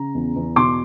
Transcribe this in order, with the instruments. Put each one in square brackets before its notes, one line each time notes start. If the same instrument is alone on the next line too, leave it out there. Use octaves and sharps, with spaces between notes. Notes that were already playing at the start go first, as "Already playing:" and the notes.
Already playing: [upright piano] C#3 A#5
E2
E2
B2 C6 D6